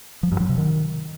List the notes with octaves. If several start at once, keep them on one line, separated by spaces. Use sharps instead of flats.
F3
G2
F#3
C3
D#3